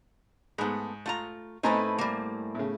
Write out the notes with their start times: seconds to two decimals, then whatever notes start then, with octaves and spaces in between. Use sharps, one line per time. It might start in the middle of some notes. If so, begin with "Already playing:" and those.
0.58 G#2 A3 B3
1.06 A3 F4 A#5
1.63 A2 C4 D#4 E4 A4 B4 G#5 A#5
1.98 G3 A#3
2.55 A2 C#3